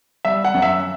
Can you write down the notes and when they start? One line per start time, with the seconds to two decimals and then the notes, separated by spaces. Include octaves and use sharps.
0.25 G3 E5
0.44 F#5
0.54 F#2
0.62 E5